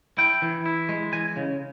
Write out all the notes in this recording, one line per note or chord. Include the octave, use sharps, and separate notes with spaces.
E4 G5
E3
E4
G#3
E3 G#5
C#3